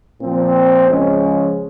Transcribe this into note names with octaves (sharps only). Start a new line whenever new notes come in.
A#2 F3 C4
C#3 F3 G#3 C#4